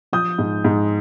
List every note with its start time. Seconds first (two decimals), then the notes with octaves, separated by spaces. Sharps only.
0.13 F3 D#6 G6
0.38 G#2
0.64 G#2